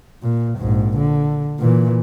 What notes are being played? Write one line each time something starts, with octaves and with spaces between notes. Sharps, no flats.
A#2
A#1 G#2
D3
A#2 E3